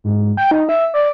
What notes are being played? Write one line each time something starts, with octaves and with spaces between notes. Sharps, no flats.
G#2
G5
D#4
E5
D5